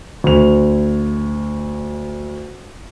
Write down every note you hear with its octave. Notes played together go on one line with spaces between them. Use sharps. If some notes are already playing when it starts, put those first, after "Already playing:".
D2 F7